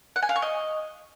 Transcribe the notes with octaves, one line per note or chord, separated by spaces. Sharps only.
F#5
G#5
F5
C#6
D#5